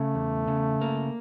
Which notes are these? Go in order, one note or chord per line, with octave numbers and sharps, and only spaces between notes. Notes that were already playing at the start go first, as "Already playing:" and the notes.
Already playing: C#3 A3
E2
C#3
A#3